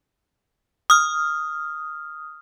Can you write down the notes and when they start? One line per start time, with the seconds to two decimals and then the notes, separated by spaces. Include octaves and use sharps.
0.90 D#6 F6